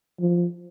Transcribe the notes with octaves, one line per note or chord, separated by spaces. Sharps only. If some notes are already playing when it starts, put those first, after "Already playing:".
F3